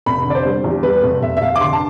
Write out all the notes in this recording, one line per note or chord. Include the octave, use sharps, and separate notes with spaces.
F1 B5
D3
D5
C5
G3
E2
G3 B4
F1
F1 E5
E5
F1 F5
D6
D3 C6
A5